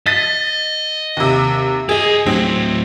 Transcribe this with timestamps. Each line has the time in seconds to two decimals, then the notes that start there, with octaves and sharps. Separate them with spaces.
0.06 D#5 A6 B6
1.17 D#2 C3
1.89 G4 G#4 D#5
2.26 A2 F#3 C4